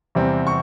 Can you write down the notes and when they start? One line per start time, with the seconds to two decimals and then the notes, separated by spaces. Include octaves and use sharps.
0.15 E2 C3 G3 C4
0.47 C#6